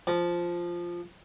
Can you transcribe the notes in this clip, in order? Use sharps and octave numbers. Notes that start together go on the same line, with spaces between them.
F3